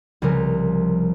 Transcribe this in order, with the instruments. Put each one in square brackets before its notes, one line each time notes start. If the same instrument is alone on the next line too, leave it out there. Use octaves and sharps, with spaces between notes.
[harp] C2 C#3 F3 A#4